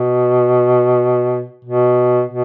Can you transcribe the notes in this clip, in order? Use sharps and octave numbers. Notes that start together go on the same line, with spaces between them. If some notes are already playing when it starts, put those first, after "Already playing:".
Already playing: B2
B2
B2